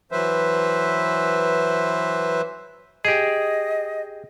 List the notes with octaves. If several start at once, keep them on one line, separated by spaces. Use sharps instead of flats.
E3 F#3 B4 C5 E5
G4 G#4 D#5